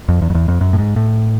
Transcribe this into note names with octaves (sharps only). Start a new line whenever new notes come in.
F2
E2
F2
E2
F2
F#2
A2
G#2
A2